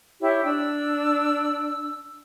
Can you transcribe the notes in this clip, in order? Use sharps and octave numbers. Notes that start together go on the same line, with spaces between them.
E4 G4 C#5
D4 E6